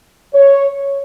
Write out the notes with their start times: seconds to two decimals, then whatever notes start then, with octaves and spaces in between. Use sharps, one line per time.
0.35 C#5